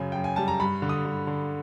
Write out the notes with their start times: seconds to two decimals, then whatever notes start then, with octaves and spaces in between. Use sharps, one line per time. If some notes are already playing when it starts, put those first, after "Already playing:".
Already playing: F#2 C#3 G#5
0.12 F#2 G5
0.24 G#5
0.36 G3 A5
0.48 A#5
0.60 G2 B5
0.82 D3
0.89 D#6
1.05 G2
1.27 D3